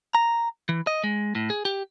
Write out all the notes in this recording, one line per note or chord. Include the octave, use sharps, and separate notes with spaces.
A#5
E3
D#5
G#3
A2
G#4
G4